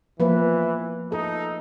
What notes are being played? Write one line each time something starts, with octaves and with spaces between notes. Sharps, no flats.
E3 F3 A#3 B4
D#4 A4